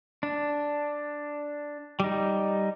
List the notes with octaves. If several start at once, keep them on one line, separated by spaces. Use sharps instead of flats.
D4
G3 D#4